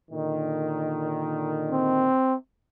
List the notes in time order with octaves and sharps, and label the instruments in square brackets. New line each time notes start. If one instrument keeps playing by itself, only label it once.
[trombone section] A#2 D3 D#3
[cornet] C4